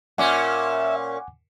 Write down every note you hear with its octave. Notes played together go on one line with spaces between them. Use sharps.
A#2 C#4 E5 F#5 G#5 D6